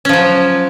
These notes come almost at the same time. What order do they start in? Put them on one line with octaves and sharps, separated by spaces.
C#4 F3 F#3